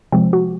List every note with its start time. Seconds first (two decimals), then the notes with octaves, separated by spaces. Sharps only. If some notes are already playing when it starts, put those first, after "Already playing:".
0.12 C3 F3 G#3 C4
0.33 F#4